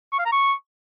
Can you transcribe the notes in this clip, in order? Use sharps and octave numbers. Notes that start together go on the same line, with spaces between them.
C#6
F5
A#5
C#6